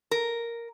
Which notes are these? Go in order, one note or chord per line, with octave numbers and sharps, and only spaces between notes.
A#4